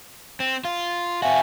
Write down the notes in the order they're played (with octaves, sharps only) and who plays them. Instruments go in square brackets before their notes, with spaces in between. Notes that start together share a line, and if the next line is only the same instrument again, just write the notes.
[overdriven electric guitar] C4
F4
[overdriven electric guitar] C4 F#4 [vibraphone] E5 F5 G#5